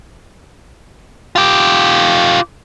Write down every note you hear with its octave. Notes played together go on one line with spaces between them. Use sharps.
F4 G4